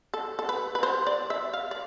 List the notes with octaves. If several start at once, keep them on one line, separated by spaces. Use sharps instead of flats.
A4
A4
B4
B4
C5
D5
E5
F5
D5